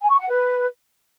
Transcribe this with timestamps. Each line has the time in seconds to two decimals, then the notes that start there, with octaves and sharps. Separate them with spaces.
0.01 G#5
0.10 C#6
0.19 F#5
0.29 B4